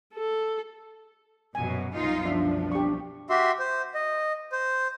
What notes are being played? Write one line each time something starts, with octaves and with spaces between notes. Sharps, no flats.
A4
A#1 F#2 B2 F#3 G#5
C2 F#2 B2 D#4 F4
F3 D4 F4 E5
G4 C#6
F#4 G4 E5 C6
C5
D#5
C5